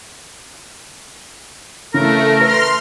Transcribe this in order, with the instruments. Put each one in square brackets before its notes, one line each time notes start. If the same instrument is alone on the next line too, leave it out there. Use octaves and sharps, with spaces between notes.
[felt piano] C#3 E3 [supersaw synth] A3 [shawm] A#4
[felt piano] B4 [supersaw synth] C6 F6